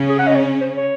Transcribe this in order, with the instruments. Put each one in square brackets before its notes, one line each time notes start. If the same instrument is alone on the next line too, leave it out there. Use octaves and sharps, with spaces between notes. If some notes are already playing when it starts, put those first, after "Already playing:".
Already playing: [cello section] C#3 C#4
[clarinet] G#4
F#5
D#5
C#5
C5
C#5